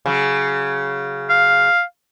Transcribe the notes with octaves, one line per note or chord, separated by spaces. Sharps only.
C#3 F#3
F5